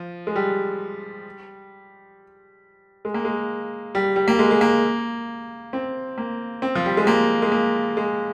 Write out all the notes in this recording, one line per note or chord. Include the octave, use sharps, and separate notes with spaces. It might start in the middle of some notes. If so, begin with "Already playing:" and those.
Already playing: F3
G#3
G3
G#3
A#3
G#3
G3
G3
A#3
G#3
G#3
A#3
C4
A#3
C4
F3
G3
G#3
A#3
G#3
A#3
G#3